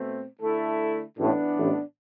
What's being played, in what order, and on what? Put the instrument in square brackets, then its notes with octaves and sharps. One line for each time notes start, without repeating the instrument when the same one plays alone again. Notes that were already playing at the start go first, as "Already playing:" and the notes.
Already playing: [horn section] B2 A3 C4
D3 A3 E4 A4
[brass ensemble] A1 A2 [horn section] E3 B3 D4
[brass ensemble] A1 A2